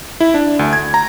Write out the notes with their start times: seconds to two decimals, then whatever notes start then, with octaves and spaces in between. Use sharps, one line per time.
0.20 E4
0.34 D4
0.59 D2
0.73 G#6
0.94 A#5